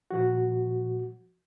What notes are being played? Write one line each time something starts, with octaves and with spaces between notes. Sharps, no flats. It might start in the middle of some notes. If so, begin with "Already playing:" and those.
A#2 F3 F#4